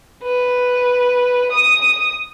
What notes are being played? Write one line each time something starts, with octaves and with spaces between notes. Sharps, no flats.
B4
D#6